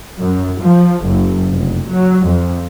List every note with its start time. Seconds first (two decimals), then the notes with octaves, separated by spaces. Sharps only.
0.19 F#2
0.61 F3
1.05 F#1
1.52 F1
1.89 F#3
2.27 F2